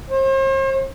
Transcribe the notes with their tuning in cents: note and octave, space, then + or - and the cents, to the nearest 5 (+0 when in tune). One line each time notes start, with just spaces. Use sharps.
C5 +45